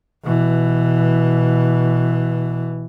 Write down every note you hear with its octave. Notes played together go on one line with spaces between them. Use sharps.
B2 E3